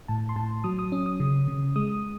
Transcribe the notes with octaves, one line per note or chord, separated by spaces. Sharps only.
A2 A5
C6
A2 A5
F#3 D#6
D#6
C#4
D#6
C#3
C#3
G#3 D#6